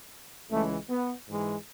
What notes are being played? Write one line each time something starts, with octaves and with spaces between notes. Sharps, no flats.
C#2 C#3 E3 G#3 A3
B3
G#2 E3 G#3